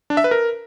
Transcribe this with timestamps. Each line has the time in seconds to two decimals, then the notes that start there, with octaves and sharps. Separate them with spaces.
0.10 D4
0.17 E5
0.24 B4
0.31 A#4